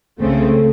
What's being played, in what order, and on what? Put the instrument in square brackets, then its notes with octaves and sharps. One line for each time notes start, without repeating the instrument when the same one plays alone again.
[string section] C#2 C#3 A3 C4